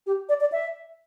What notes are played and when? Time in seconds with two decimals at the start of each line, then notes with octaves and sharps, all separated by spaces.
0.07 G4
0.29 D5
0.40 D5
0.52 E5